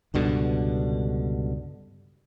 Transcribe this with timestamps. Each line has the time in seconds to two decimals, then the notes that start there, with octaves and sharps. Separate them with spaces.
0.14 C#2 G2 B2 D3